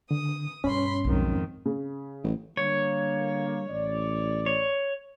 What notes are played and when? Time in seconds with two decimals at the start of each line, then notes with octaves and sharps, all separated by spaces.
0.11 D3 D#6
0.64 G2 B2 C#4 C#5 B5 C6
1.04 B1 F2 G#2 D#3
1.66 C#3
2.24 A1
2.57 D3 G3 A#3 C#5
3.69 A1 D5
4.46 C#5